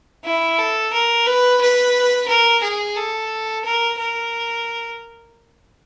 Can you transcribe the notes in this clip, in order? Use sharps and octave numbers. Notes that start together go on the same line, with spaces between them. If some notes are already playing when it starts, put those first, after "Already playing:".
E4
A4
A#4
B4
B4
A#4
G#4
A4
A#4
A#4